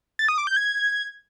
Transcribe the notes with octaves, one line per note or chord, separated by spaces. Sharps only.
A6
D#6
D6
G6
G#6